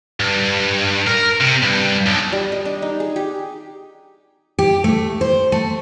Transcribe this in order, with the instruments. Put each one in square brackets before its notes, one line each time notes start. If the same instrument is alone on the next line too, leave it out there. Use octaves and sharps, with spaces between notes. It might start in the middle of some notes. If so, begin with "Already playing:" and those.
[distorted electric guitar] G2
A#4
C3
G2
B1
[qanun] G3
D#5
D4
D#4
G#4
G4
[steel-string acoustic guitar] G4
A3
C5
A3